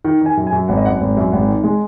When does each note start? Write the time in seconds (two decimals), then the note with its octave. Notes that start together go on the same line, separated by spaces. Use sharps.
0.05 D#3
0.21 D#3 G#5
0.37 F#2
0.47 G#5
0.52 F#2
0.68 G#1 F#5
0.77 D#5
0.84 F#2 F#5
1.01 G#1
1.17 F#2
1.32 G#1 F#5
1.48 D#3
1.64 G#3